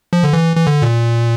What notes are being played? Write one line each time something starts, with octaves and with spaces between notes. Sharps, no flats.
F3
D3
E3
E3
D3
A#2